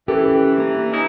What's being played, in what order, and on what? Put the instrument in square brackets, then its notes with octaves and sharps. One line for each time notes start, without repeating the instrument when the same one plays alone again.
[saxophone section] E3 [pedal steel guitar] C#4 [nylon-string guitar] G4 [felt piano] A4
[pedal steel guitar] A#3 D4 A#5
[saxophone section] C#4 D#4 E4